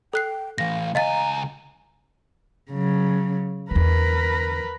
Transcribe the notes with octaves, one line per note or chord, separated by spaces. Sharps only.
A4 G5 F#6 C7
A2 E3 F5 A#6
C#2 D#5 F5 G#5 A#5 A6
C#3 F#3
E2 D3 A#4 B4